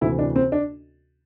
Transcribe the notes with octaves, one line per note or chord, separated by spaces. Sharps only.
D2 C3 E3 E4
D4
C4
D4